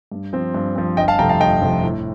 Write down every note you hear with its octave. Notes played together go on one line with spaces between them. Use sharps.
G2
F3 C4
G2
F3 C4
G1 D#5 G5
F5 A5
F2 C3 F3 A3 G5 A#5
F5 A5
G1 D#5 G5
F2 C3 F3 A3
A2